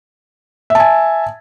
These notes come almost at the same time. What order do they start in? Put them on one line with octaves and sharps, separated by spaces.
E5 A5 G#5